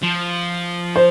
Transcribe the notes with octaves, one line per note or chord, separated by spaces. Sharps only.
F3
C5